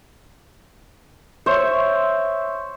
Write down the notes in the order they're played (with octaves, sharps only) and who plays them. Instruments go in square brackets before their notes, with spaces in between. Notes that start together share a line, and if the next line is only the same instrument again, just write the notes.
[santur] C5 C#5 E5